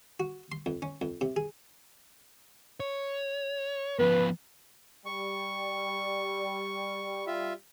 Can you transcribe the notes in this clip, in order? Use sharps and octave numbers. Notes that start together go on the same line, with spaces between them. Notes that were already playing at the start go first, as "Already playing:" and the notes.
F#4
C6
F2
C#4
F2
C3
G#4
C#5
F3 B3 B4
G3 C#6
F4 E5